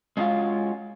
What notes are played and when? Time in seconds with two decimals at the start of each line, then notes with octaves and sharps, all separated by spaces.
0.17 G#3 C#4 F4 F#4 F5